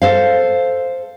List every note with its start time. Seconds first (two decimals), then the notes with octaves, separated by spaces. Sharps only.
0.02 A4 C5 F5